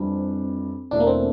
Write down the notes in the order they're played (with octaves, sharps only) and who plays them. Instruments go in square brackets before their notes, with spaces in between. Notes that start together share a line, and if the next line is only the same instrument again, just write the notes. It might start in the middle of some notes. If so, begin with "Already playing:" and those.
Already playing: [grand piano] F2 E3 G3 D4 [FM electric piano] C4
[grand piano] E1 E2 E3 A3 E4 [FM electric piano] D4
[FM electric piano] A#3
C4